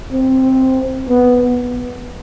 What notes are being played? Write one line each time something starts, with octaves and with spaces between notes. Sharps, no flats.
C4
B3